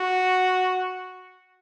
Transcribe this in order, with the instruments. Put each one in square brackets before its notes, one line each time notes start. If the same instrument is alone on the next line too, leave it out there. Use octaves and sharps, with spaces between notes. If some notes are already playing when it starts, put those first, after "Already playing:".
Already playing: [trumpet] F#4